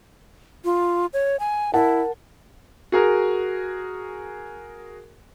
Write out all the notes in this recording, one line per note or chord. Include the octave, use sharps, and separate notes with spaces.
F4
C#5
G#5
E4 A#4 F#5 A5
F#4 G#4 A#4